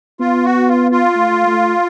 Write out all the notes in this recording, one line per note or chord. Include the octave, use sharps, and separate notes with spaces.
B3 F4
F#4
F4
F4
A3
A3